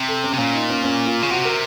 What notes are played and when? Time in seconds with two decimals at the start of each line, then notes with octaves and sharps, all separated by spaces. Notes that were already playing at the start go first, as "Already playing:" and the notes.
Already playing: C3
0.08 A4
0.24 C#4
0.34 C3
0.38 A#2 C#4
0.53 D#4
0.70 C#4
0.84 C#4
1.06 F4
1.22 C#3
1.30 C3 F#4
1.45 A#4